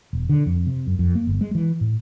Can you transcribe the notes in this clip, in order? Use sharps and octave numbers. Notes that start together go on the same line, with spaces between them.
E1
D3
F2
C3
F#2
F2
A#3
G1
G#3
E3
A2